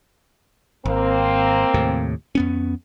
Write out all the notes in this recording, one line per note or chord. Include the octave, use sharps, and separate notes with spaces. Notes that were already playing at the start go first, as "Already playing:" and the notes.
G#1 A#3 C4
D#2 A2 C3
F2 B3 C#4